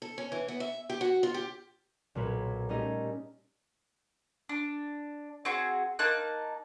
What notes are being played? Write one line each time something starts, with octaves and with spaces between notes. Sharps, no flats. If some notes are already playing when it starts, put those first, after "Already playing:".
A4
C#4
E3
B3
E5
G4
F#4
F4
G4
B1 A#2 A#3 B3 B4 C#5
G3 A3 C#4 D#4 A#4 D#5
D4
C4 F#4 G#4
A#3 D#4 A5 F#6